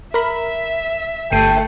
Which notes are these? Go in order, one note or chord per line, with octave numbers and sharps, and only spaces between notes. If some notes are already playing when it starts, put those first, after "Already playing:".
A#4 E5 B5
G1 A3 G5 C7 D#7